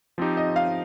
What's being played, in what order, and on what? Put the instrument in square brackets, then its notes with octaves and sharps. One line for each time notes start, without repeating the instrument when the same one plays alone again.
[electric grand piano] F3 C4 D#4 G4
[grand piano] D#5
F5